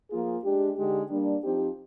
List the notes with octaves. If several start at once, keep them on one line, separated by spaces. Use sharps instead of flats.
F3 A#3 F4 G#4
G#3 D4 G4
D3 G#3 D#4 G4
G3 A#3 D4
F3 C4 D#4 G4